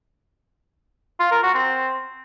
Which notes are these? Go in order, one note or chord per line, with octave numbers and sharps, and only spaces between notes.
F4
A#4
F#4
C4